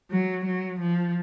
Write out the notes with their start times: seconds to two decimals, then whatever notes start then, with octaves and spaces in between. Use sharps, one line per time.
0.11 F#3
0.46 F#3
0.81 F3